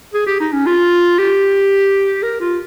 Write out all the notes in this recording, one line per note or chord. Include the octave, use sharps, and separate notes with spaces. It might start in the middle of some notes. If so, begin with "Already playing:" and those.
G#4
G4
D#4
C#4
F4
G4
A#4
F4